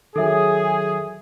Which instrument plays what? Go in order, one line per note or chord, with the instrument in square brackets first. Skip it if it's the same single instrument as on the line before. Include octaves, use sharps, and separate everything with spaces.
[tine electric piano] D#3 F#3 [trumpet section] G#4 [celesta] A4 E5